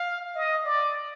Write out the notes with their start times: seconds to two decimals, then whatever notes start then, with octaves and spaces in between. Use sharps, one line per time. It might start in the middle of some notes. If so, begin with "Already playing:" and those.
Already playing: F5
0.35 D#5
0.65 D5